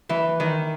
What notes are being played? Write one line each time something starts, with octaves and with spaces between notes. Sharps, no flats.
E3
D#3